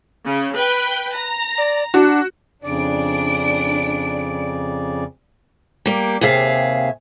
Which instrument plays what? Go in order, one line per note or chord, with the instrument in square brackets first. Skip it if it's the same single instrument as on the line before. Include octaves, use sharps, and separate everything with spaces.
[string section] C#3
B4 G5
A#5
[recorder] D5
[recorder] D4 [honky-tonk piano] F#4
[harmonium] F2 C#3 D5 [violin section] D4 D7
[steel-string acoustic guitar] G3 A#3
D#2 C3 G#4 E5 F5